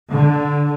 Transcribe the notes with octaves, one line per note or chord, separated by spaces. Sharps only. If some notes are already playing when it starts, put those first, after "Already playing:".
D3